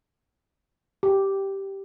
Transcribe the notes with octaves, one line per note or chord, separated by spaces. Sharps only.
G4